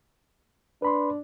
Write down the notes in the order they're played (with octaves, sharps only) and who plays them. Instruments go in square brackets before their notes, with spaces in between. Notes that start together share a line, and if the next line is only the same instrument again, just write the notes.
[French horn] D4 [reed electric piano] B4 B5 C6